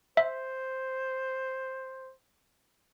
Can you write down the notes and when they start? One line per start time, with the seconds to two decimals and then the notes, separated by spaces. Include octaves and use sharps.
0.17 C5 E5